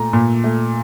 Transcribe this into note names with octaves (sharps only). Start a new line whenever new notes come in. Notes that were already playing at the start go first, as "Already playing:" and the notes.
Already playing: A#2 A3 A#5
A#2
A3